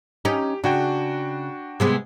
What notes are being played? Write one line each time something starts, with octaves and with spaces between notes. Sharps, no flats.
C#4 D#4 G4
C#3 D4 F#4 G5
C3 G#3 B3